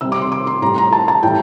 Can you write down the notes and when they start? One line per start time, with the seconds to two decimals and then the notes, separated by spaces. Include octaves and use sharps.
0.01 C3 G3 E6
0.12 D6
0.22 C6
0.32 D6
0.47 C6
0.62 A2 G3 A#5
0.78 A#5
0.93 A5
1.08 A5
1.23 A2 E3 G3 G5